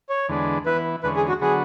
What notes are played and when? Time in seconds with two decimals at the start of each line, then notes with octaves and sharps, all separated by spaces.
0.09 C#5
0.29 E2 D3 G#3 B3 D4
0.66 E3 B3 E4 B4
1.03 E2 D3 G#3 C#4 B4
1.16 G#4
1.28 F#4
1.41 D3 F#3 B3 F#4 G#4